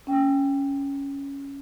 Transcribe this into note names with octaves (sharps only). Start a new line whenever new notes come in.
C#4 G5